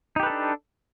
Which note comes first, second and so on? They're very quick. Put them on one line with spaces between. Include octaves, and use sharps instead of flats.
D#4 G4 B4 A4 D4